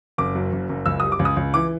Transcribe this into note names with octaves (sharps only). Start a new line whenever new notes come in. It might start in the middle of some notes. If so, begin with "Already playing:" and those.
F#1 D6
F#2
F#1
F#1
C#2 E6
G3 D#6
D6
C#2
D#6
C#2
E3 D6